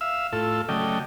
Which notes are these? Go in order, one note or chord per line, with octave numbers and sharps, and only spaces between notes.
E5 F5 E6
A2 F4 A4 E6
C#3 F#3 A3 D5 D#5 G5